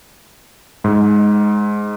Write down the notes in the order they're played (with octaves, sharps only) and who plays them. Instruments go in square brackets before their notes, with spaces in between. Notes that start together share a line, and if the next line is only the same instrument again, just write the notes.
[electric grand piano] G#2